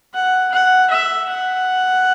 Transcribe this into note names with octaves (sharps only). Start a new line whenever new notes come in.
F#5
F#5
E5
F#5